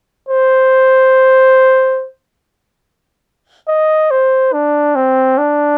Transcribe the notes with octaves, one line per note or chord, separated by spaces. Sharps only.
C5
D#5
C5
D4
C4
D4